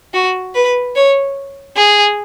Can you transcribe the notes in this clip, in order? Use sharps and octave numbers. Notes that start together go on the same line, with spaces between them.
F#4
B4
C#5
G#4